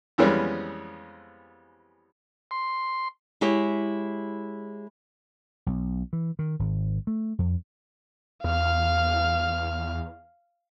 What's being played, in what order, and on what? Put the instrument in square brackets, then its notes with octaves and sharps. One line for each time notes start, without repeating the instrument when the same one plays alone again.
[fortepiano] F2 E3 G3 G#3 B3 C#4
[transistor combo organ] C6
[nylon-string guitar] G#3 E4 G4 G#4 C#5
[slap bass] B1
E3
D#3
G#1
A3
F2
[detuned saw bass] E2 [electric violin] F5 F6